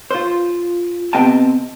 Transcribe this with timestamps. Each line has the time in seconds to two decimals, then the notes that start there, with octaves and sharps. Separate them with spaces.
0.11 F4 C5
1.13 C3 B3 C4 D#5 G5 A5